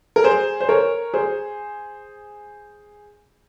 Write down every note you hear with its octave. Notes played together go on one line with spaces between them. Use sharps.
A#4
G#4 C5
C5
A#4 C#5
G#4 C5